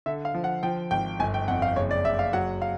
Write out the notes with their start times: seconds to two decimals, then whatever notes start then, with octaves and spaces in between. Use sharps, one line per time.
0.06 D3 E5
0.25 F5
0.34 F3
0.44 F#5
0.63 F3 G5
0.91 G#1 G5
1.20 G1 G#5
1.34 G5
1.48 F2 F#5
1.62 F5
1.76 F#1 C#5
1.91 D5
2.05 F#1 E5
2.19 F5
2.33 F#3 F#5
2.62 F5